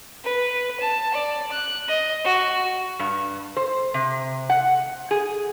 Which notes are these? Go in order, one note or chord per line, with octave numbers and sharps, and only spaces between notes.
B4
A5
D5
F#6
D#5
F#4
G2
C5
C3
F#5
G#4